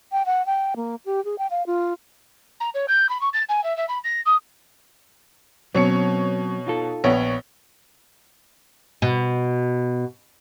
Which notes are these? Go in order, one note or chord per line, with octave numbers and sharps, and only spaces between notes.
G5
F#5
G5
A#3
G4
G#4
G5
F5
F4
A#5
C#5
G6
B5
C#6
A6
G#5
E5
E5
B5
A#6
D#6
B2 F#3 C4 C#4 C#5 C#7
D#4 F4 A4
A#1 B3 C#5
B2